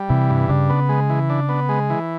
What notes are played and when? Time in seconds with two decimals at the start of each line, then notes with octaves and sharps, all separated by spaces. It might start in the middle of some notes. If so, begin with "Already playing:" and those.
Already playing: G3
0.09 C3 E3
0.30 G2
0.49 C#3 D4
0.70 B3
0.89 G#3
1.10 E3
1.30 D4
1.49 B3
1.69 G#3
1.90 E3